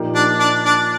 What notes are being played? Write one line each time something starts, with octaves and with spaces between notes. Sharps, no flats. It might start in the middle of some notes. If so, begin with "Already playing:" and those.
Already playing: A#2 F3 A#3 D#4 G4
D4
D4
D4